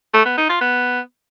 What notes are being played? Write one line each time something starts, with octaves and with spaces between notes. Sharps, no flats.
A3
B3
D#4
F4
B3